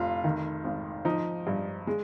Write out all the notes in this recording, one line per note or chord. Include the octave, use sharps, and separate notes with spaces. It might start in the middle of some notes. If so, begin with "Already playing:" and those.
Already playing: F1 F4
D#3
G#1
F3 D#4
G2
G#3